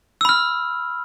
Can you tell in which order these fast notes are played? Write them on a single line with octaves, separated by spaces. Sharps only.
E6 B5 F6